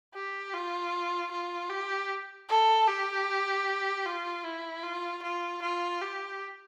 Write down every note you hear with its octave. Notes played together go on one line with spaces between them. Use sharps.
G4
F4
F4
G4
A4
G4
F4
E4
F4
F4
F4
G4